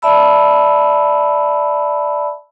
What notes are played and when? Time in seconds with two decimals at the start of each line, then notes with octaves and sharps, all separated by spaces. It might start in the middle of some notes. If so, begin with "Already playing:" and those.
0.02 D5 E5 A5 B5 E6